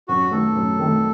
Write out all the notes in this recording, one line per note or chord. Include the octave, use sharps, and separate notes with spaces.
F#2 F#4
D#3 A3 A4
F#2
D#3 A3